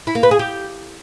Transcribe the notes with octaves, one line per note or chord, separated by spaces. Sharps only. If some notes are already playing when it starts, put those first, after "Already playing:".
E4
A#3
B4
G#4
G4